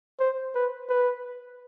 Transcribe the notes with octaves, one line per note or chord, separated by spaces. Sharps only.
C5
B4
B4